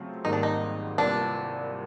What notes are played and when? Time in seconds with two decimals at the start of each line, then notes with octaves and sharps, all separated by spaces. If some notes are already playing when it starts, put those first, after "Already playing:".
Already playing: C#3 F#3 A3 C4 F4
0.24 G#1 G#2 D#3 G3 A#3 D#4
0.33 D4
0.43 D#4
0.98 C2 A#2 G3 B3 D4